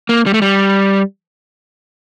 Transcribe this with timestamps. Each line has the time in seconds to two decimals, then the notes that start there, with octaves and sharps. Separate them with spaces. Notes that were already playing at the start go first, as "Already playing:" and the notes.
0.09 A#3
0.26 G3
0.34 A3
0.42 G3